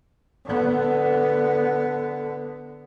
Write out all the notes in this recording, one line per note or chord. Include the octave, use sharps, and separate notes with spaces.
D3 B3